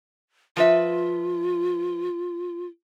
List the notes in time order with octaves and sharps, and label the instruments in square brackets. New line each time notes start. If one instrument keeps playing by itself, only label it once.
[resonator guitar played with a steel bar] F3 B4 E5 [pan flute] F4